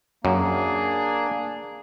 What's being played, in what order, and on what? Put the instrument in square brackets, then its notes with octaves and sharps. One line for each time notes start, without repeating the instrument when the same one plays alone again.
[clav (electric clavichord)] F#2 [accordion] A#3 [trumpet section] D4 G#4